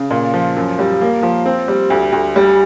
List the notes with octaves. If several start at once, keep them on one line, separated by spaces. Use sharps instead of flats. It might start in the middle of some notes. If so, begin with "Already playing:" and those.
Already playing: C#3
A#2
F3
F#2
G3
A#3
F3
C4
G3
D2
D2
G3